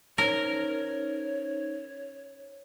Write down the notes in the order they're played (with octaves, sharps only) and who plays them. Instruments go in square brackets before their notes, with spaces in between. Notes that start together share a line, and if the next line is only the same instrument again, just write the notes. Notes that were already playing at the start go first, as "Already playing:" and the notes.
[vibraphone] C#4 D#4 C5 [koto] A#4 [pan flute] C#5